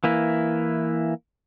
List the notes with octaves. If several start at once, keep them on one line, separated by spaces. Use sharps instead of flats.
E3 A#3 E4